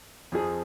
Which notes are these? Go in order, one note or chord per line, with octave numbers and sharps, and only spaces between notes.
F2 F3 C4 G#4